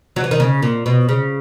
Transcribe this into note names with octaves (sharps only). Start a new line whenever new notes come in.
F#3
E3
D#3
C#3
A#2
B2
C#3